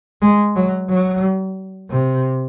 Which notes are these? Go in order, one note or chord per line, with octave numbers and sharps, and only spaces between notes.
G#3
F#3
F#3
C3